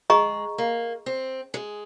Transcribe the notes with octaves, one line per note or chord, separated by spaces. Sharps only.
G#3 G#4 D#5 A#5 C#6
A#3
C4
G#3